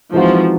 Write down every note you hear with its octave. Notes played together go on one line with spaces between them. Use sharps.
E3 F3 G#3 C4 D#4 F#4